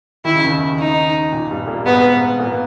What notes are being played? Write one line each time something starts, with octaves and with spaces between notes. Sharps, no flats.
D#3 E4
C#3
D#2 D#3
D#4
A#2
G2 G3
A#2 A#3
G#2 G#3 B3
A#2 A#3
B3